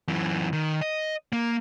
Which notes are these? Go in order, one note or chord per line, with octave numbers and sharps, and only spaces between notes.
F#2 E3
D#3
D#5
A#3